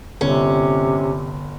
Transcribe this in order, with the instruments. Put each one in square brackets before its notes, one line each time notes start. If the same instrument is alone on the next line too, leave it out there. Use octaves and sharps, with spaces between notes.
[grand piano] G1 [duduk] C3 [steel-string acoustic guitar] C#4